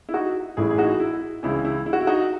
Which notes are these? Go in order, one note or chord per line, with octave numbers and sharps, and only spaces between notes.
E4
D#4 F#4
A1 A2 E3 E4 G#4
G#4
D#4 F#4
E4
C#2 C#3 E3 E4
E4
E4
F#4
E4
D#4 F#4